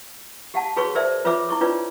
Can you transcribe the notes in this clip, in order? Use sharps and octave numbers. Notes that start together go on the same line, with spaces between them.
G4 F5 F#5 A5
F#4 G#4 B4 C#5 C#6
A#4 C5 D5 E5
F4 B4 C#5 E5 D6
E4 C#6 D6
D4 F4 B4 C#5 D5